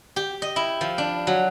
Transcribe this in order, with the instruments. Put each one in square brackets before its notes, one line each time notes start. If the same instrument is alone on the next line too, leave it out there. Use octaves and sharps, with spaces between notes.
[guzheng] G4
D#5
E4
F3
D4
F#3